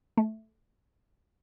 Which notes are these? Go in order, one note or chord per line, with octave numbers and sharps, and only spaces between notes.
A3